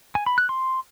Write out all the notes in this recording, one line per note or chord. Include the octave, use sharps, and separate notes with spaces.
G#5
B5
F#6
C6